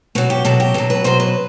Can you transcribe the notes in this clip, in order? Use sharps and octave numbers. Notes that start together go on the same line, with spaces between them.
B2 F#3 F#4
G4
B2 F#3 A4
G4
B2 F#3 A4
B4
B2 F#3 C5
B4